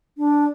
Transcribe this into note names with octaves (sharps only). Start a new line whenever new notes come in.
D4